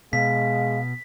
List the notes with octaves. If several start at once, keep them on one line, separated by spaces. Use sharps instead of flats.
B2 G#3 F5 B6